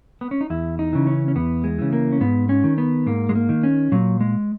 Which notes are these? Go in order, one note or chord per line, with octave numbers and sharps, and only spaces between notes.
B3
C#4
D#4
E2 E4
D#4
C#3 E3
C#4
C#4
E2 B3
G#3
C#3 E3
A#3
C#4
G#2 B3
C#4
D#3
B3
G#2 A#3
G#3
A#3
D#3
C#4
A#2 F#3
G#3